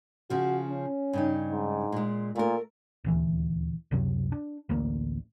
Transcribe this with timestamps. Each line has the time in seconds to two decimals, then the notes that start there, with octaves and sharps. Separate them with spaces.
0.30 C#3 F3 F#4
0.70 C#4
1.13 G2 C#3 D#4
1.51 G#2
1.92 A#2 G#3
2.36 A#2 A3 A#4
3.04 D#1 D2 E3
3.91 C#2 F#2 C3 F#3
4.32 D4
4.69 A1 D2 A2 A#3